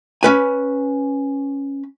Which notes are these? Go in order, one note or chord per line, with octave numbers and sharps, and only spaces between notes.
C#4 B4 G#5